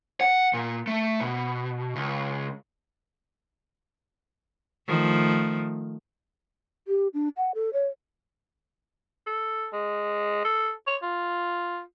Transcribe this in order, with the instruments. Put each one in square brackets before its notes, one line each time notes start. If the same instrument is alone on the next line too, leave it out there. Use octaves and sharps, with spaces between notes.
[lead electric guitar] F#5
A#2
A3
B2
C#2
[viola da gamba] D#3 F3 A3
[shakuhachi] G4
D4
F#5
A4
C#5
[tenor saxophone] A4
G#3
A4
C#5
F4